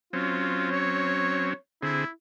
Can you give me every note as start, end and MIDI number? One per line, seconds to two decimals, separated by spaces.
0.13 1.53 54
0.13 1.53 60
0.13 1.53 61
0.13 0.67 65
0.71 1.56 73
1.83 2.04 50
1.83 2.04 60
1.83 2.10 64
1.83 2.04 68